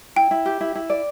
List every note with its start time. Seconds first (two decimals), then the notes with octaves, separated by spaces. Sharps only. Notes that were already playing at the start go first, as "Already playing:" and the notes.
0.16 E4 G5
0.31 E4
0.46 G4
0.61 E4
0.75 E4
0.90 D5